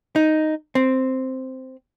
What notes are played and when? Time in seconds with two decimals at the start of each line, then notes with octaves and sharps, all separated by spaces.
0.16 D#4
0.75 C4